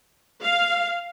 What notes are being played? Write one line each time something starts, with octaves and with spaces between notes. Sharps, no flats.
F5